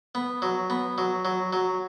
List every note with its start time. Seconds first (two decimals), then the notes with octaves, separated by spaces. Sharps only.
0.15 B3
0.42 F#3
0.70 B3
0.98 F#3
1.25 F#3
1.53 F#3